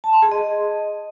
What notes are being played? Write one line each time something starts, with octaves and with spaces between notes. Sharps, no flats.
A5
C6
G#4
D#5